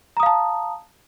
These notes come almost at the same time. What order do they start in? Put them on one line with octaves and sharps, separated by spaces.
A#5 D#6 F5 A5